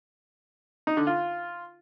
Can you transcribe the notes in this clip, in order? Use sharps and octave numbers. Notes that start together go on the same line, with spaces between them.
D#4
D3
F4